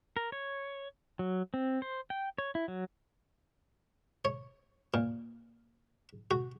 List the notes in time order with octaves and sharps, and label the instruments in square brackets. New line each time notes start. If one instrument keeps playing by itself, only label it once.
[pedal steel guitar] A#4
C#5
F#3
C4
C5
G5
C#5
E4
F#3
[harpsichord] C#5
A#2
F#4